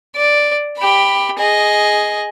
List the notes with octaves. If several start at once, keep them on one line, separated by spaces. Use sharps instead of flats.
D5
G4 B5
G#4 D#5